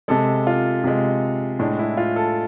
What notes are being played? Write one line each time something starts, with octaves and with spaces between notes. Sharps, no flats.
C3 G#3 A4
F4
C3 G#3
A2 G#3 D4
E4
F4
A4